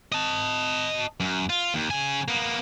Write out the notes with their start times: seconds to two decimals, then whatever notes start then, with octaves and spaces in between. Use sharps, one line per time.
0.12 D#5 A5
1.20 F#2
1.50 F4
1.74 D#2
1.91 C#3 G#5
2.28 A#3 B3